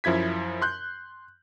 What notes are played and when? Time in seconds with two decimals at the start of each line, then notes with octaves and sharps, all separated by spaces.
0.04 F#2 F3 E4 G#6 B6
0.62 C6 F#6 G6